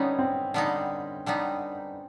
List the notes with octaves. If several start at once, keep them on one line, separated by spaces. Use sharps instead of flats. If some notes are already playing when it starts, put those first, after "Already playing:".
Already playing: D3 G3 B3 C#4 D#4
C4
D3 G3 B3 D#4
D3 G3 B3 D#4